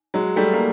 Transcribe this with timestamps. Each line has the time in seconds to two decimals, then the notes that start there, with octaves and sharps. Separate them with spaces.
0.14 F#3 G#3
0.36 G3 A3
0.53 A#3